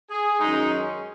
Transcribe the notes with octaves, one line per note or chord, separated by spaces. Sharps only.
G#4
F#2 D#3 G#3 D#4
C#4